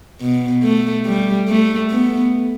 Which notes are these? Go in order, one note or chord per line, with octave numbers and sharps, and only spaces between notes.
B2
A3
G3
A3
B3